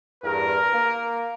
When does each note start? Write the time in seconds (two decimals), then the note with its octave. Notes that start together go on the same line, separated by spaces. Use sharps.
0.24 E2 G2 A#4
0.73 A#3